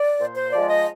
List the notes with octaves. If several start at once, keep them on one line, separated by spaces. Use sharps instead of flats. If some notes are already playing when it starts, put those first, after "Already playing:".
Already playing: D5
A#2 C5
C5
F3 G#3 D5
D#5